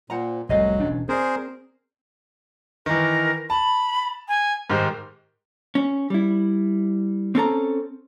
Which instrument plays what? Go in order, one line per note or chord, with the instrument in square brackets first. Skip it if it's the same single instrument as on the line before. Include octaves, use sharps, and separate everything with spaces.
[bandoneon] A#2 [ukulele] C5 F#5 A#5
[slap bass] F1 C2 A3 [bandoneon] F#3 [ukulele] G#4 D#5 F5
[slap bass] E1 C#4 D4
[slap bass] C4 [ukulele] F#4 D5 [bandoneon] G#4 A#4 C5
[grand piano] D#3 E3 [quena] A#4
[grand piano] A5 [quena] B5
[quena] G#5
[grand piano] G#2 D#3 G4 [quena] C5
[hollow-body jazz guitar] C#4
G3 E4
C4 C#4 A4 A#5